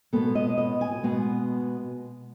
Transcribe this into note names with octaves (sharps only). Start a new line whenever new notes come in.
B2 G#3 B3 A4
D#5
D#5
G#5
B2 G#3 B3